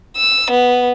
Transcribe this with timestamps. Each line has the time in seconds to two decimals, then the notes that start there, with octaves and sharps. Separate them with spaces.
0.17 E6
0.51 B3